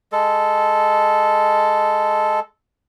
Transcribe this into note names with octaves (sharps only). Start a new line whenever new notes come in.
G#3 A4